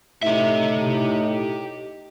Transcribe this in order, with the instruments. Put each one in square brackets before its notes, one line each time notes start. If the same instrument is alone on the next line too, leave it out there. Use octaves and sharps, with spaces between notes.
[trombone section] A2 D#4 [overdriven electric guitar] G4 E5